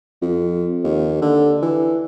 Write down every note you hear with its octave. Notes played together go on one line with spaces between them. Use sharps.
F2
D#2
D3
E3